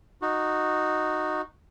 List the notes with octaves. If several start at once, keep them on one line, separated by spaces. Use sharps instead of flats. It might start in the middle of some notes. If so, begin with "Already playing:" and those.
D#4 F#4